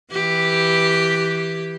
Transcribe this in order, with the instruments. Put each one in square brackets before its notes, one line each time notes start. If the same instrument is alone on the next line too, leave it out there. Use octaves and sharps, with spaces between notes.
[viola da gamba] E3 G4